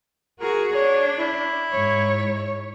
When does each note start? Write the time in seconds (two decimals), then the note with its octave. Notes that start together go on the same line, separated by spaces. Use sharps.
0.40 F#4 G#4 A#4
0.75 D4 C#5
1.19 E4
1.71 G#2 C#5